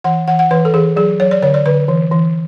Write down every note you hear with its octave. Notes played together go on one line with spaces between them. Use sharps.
E3 F#5
E3 F#5
F#5
E3 B4
A4
E3 G#4
F#3 G#4
F#3 C#5
D5
D3 C#5
D5
D3 B4
E3
E3